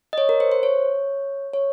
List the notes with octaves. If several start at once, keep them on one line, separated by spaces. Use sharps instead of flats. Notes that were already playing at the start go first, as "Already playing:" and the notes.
D#5
C#5
A#4
C5
C5
C#5
C#5